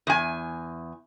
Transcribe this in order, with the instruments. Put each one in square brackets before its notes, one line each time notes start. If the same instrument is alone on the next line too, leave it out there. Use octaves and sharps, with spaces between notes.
[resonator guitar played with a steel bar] E2 G#5